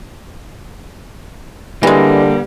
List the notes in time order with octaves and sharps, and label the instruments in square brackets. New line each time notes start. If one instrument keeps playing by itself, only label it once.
[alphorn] D3 [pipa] E3 G#3 [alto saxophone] G3 [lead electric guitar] A#3